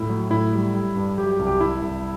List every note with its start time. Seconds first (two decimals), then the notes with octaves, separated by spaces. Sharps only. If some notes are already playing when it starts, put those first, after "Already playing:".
Already playing: A2 E4
0.09 F#3
0.30 A2 E4
0.53 G3
0.74 G3
0.96 G2
1.18 F#3 G4
1.31 G4
1.39 C2
1.47 G4
1.60 G3 E4
1.82 C2